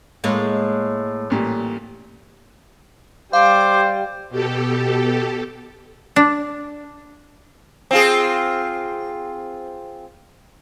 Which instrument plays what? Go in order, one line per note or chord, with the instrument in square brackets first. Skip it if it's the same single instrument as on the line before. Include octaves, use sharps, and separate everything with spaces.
[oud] A2 G#3 A#3
[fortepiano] A1 A#2 G3
[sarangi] G3 [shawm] C5 [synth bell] F5 [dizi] D6
[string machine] B2 G4 A4
[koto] D4
[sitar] C4 F4 G#4